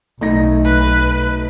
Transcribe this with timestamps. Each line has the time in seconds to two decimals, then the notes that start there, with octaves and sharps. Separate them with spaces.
0.21 B1 A3 D#4 A#6
0.65 B4